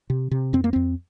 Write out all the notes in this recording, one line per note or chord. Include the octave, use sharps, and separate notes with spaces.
C3
C3
F2 C4
A#3
F2 C4